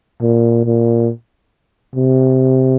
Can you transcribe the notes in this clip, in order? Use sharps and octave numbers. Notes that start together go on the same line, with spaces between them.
A#2
A#2
C3